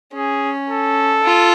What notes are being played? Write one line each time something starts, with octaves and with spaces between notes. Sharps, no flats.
C#4 G#4
A4
F4